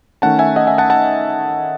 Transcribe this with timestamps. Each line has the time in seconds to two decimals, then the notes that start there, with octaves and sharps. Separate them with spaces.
0.22 D#3 A3 C#4 F#5 A5
0.39 E5 G#5
0.56 D#5 F#5
0.67 E5 G#5
0.78 F#5 A5
0.90 F#5 A5